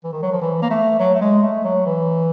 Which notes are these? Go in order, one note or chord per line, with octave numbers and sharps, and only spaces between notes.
E3
D#3
F#3
F3
E3
A#3
A3
F#3
A3
G#3
A3
F#3
E3